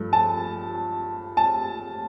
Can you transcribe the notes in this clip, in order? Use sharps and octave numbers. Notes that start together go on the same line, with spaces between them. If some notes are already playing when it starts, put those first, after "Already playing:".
Already playing: G2 F3 A3
A5
A5